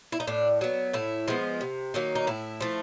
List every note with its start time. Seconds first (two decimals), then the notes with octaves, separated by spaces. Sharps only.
0.12 E4
0.20 D#4
0.27 A2 D4
0.61 F#3 B3
0.93 A2 E4
1.28 F3 G#3 B3
1.61 C3
1.94 D#3 F#3 A#3
2.15 D#4
2.27 A2 E4
2.60 F3 A3